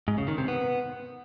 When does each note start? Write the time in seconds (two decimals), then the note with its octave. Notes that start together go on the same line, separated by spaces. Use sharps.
0.08 G#2
0.18 C#3
0.28 D#3
0.38 C3
0.48 B3